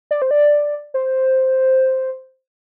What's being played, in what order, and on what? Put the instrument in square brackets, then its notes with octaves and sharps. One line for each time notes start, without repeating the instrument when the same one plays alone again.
[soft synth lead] D5
C5
D5
C5